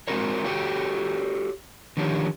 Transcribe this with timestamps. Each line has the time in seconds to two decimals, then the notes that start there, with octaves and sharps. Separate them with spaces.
0.08 G#3 C4 F#4 G#4 A#4 C#5
0.44 F#4 G4 A4 C#5 G5
1.97 D3 D#3 F3 G4 C#5